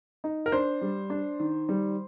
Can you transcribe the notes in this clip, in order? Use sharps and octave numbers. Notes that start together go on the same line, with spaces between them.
D#4
A#4
D4 C5
G3
D4
D#3
G3